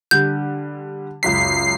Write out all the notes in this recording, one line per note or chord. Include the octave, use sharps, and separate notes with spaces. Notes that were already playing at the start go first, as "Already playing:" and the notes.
D3 G3 G6
C#2 F#2 B6 C7